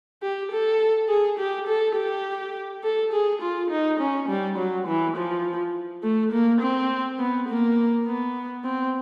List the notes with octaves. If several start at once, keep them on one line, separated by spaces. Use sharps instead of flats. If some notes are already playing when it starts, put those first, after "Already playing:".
G4
A4
G#4
G4
A4
G4
A4
G#4
F4
D#4
C#4
G3
F#3
E3
F3
A3
A#3
C4
B3
A#3
B3
C4